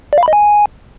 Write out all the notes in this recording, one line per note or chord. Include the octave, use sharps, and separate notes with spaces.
D5
F5
B5
D#5
G#5